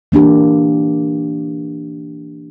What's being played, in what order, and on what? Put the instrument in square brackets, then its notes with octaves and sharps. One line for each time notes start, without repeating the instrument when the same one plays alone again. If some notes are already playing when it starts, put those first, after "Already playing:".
[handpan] E3 A#3 D4 G4